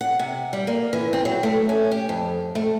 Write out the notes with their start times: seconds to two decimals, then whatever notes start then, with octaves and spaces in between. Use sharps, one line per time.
0.01 F#5
0.19 C3
0.53 G3
0.67 A#3
0.93 E3
1.13 C4
1.25 F#3
1.43 A3
1.69 C#4
1.91 G4
2.09 F2
2.55 A3